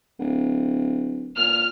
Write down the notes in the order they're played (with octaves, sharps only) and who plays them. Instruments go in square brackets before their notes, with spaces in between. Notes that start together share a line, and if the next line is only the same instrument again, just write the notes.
[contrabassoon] D1
[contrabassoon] A#2 [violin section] F6